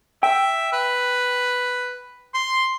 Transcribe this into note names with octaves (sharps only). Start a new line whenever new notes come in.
E5 G5
B4
C6